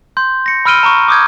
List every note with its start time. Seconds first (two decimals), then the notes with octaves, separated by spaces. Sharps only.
0.17 C6 G6
0.46 A#6 C#7
0.65 B5 E6 F6 D7 D#7 G7
0.83 A#5 C#6
1.08 D6 D#6 G6 G#6